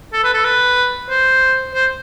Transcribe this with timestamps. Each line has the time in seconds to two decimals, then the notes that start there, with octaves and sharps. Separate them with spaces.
0.13 A4
0.24 B4
0.34 A4
0.45 B4
1.09 C5
1.75 C5